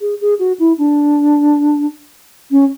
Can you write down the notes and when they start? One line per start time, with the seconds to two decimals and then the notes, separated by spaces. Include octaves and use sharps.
0.01 G#4
0.21 G#4
0.39 F#4
0.59 E4
0.78 D4
2.51 C#4